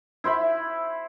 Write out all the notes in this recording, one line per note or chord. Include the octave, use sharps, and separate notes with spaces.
E4 C5 E5 B5